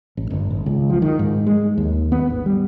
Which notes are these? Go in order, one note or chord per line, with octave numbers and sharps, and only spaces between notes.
A1
G1
G#1
C#2
F3
D#3
G#2
G#3
D#2
B3
G#1
G3